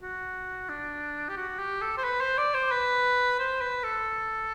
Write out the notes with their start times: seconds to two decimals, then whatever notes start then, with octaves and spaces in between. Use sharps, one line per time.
0.01 F#4
0.69 D4
1.29 G4
1.37 F#4
1.59 G4
1.81 A4
1.97 C5
2.04 B4
2.21 C5
2.38 D5
2.54 C5
2.71 B4
3.39 C5
3.61 B4
3.84 A4